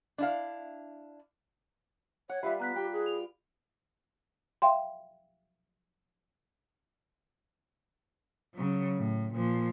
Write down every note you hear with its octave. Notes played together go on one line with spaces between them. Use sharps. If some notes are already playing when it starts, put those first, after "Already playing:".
D4 E4 F5
C#5 F#5
G3 F4 G4 B4 E5
B3 A#5 F#6 B6
G4 G5
G#4
F7
E5 F5 G5 C6
C#3 F#3
A2
A#2 F3